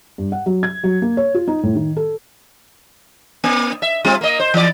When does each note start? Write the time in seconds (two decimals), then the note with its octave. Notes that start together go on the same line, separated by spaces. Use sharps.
0.18 G2
0.32 F#5
0.46 F#3
0.63 G#6
0.83 F#3
1.02 A#3
1.17 C#5
1.34 F4
1.47 D#4
1.63 A2
1.75 D#3
1.97 A4
3.44 A#3
3.82 E5
4.04 G3 C4 F4
4.21 A#3 D#5
4.40 C5
4.54 E3 D5